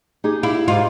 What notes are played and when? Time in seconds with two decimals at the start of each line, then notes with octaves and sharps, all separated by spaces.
0.24 D#4 G4 G#4
0.43 E4 F5
0.68 G#2 F4 G4